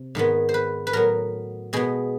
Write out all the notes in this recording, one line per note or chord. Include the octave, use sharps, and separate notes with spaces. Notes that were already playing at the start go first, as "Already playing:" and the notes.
Already playing: C3
G#2 D#3 G#3 B3
C5
B4
B4
A2 F#3 B3 A#4
B2 G#3 B3 G#4